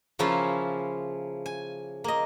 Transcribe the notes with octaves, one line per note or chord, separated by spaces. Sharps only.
C#3 F3 A#3 C#4 E4 F4
G#5
A#3 D#5